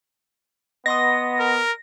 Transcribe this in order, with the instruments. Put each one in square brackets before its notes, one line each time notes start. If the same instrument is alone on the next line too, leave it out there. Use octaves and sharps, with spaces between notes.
[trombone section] B3 [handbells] D#5 C6 D#6 [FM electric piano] A#6
[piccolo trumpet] A#4